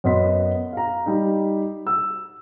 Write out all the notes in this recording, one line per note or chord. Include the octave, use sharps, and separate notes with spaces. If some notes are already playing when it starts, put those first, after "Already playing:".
F#2 B3 D#5 C6 B6
F5 A#5
G3 D#4
E6